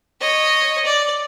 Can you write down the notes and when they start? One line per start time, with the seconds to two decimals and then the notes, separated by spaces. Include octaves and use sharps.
0.21 C#5 D#5
0.84 D5